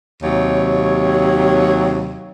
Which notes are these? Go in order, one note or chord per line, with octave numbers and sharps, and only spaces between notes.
D#2 C3 F#3 C#5